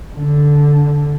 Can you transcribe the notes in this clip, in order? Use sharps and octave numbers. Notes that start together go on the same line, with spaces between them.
D3